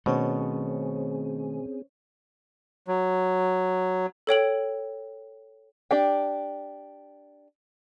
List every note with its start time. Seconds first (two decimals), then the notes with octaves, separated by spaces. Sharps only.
0.06 B2 D#3 A3 C4 C#4 G#4 C5 C#5
2.88 F#3
4.27 A4 C#5 G5 F#7
5.91 D4 G4 G5